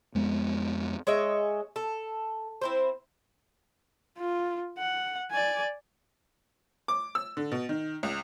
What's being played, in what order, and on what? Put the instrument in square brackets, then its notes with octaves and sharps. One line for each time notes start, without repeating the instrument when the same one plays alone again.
[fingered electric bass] F2 G#3 B3
[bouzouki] G#3 C#5 D#5 E5
A4
C4 E4 C5
[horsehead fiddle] F4
F#5
D5 G#5
[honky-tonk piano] D6
E6
D3
B2
D#3
C#2